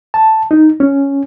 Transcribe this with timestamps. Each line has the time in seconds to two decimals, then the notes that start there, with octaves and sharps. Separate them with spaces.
0.14 A5
0.51 D#4
0.80 C#4